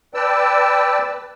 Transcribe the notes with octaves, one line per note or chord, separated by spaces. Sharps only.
B4 D5 G5 A5 E6